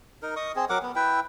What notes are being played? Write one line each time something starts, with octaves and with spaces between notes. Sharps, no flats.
D#4 A#4
D#5 C#6 D#6
C4 G#4
F#3 A#4 F#5 D6
B3
E4 B4 E5 G5